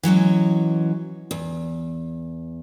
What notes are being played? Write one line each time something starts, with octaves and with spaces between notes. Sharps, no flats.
E3 F#3 G#3 C#4
E2